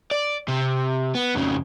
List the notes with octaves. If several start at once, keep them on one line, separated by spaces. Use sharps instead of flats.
D5
C3
B3
F2 C#3